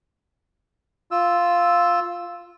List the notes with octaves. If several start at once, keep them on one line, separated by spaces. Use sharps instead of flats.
F4 E6